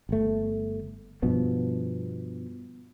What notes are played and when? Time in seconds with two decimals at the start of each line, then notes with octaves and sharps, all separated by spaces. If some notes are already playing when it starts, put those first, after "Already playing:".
0.09 G1 A3
1.22 G2 B2 F3 B3